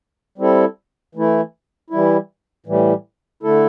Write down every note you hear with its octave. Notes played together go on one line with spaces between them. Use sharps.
G3 C4 E4 A4
E3 A3 E4
E3 G3 E4
A2 E3 G3
D3 A3 E4 A4